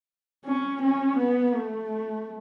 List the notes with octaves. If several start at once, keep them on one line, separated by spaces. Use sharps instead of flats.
C#4
C#4
B3
A3